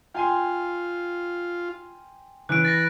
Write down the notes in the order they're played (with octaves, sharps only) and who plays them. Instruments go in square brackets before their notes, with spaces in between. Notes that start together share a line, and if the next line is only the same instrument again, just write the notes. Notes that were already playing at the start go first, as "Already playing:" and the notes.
[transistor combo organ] F4 [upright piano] G5 G#5 C6
[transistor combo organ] C#3 [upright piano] E3 [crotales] F#6 D7
[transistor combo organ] B5 [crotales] A6 A#6